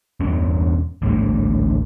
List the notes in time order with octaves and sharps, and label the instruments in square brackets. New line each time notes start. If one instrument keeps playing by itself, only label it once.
[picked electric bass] E1 E2 G2 C#4
A1 D2 G#2 G3